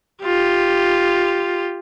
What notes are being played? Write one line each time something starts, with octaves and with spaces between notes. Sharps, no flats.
F4 G4